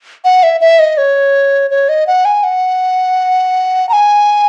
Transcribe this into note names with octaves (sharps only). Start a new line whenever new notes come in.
F#5
E5
E5
D#5
C#5
C#5
D#5
F#5
G#5
F#5
A#5
G#5